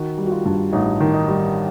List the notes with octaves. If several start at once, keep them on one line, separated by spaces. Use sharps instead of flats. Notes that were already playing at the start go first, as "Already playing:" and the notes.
Already playing: D#3 F#4
G3
F#4
F4
G2
A1 D#4
D#3
D#4
G3